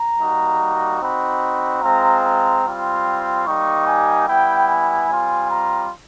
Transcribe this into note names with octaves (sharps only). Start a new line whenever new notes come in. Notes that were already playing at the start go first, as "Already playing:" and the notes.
Already playing: A#5
G3 A#3 D#4 F#4
C4 D#4 F#4 B5
G#3 C4 F4 A#5
A#5
G3 C4 F4
G3 A#3 D#4 G4 C#6
G#5
G3 B3 E4 G5
G#5
G3 C4 F4
A#5